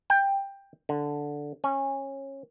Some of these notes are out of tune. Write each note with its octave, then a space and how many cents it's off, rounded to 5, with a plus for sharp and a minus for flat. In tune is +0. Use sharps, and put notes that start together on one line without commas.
G5 +10
D3 -5
C#4 -20